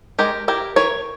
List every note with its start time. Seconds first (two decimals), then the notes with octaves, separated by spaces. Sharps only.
0.19 G#3 G4 A#4
0.48 E4 G4 A#4
0.76 E3 A#4 C#5